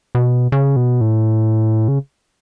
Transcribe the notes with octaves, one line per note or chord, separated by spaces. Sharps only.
B2
C#3
B2
A2
C#3